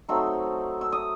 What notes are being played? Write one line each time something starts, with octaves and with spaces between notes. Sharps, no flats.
F#3 A3 C4 D#4 E6
E6
D#6